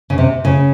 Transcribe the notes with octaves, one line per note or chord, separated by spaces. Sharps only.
C#3
C3
C#3